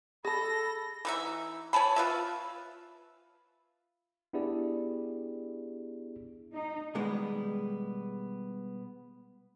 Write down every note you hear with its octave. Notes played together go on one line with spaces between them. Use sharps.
G#4 A4 A5 B5 A#6
E3 D#4 E5
C#5 G#5 A5 B5
F4 B4 E5
B3 D4 E4 G4 G#4 D5
D#4
B2 D#3 G3 G#3 B3